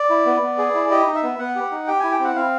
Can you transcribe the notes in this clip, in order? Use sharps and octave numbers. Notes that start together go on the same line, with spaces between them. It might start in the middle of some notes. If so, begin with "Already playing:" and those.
Already playing: D5
E4
B3
B3
G#4
E4
G4 D#5
D#4
E5
B3
B3 F#5
G4
D#4
G4 G5
E4 G#5
G5
C4 F#5
C4 F5